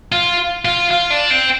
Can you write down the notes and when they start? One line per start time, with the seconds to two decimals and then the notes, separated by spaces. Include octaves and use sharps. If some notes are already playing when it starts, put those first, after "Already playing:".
0.12 F4
0.65 F4
0.91 F4
1.10 D4
1.30 C4